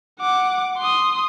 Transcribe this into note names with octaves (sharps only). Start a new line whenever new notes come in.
F#5 D6
C6 D#6